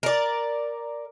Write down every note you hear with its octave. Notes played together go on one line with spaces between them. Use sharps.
A#4 D5